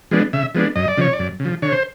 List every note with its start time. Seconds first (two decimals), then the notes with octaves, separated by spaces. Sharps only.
0.11 F3 G#3 B3 D4
0.33 C#3 E5
0.55 F3 G#3 B3 D4
0.76 F#2 D#5
0.88 D5
0.98 C#3 F3 C#5
1.13 D5
1.19 F#2
1.40 C#3
1.45 F3
1.62 D3 C#5
1.72 C5